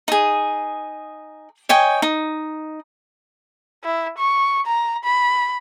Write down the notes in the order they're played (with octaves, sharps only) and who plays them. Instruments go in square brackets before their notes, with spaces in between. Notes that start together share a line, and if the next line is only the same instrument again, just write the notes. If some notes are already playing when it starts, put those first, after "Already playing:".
[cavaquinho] D#4 G#4
C#5 D#5 G5 G#5
D#4
[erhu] E4
C#6
A#5
B5